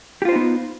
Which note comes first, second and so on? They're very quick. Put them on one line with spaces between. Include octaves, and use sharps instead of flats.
G4 F4 C5 D#4 B3